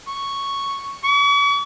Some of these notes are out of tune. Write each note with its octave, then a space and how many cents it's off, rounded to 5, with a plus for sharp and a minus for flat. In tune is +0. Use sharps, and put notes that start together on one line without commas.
C#6 +0
C#6 +45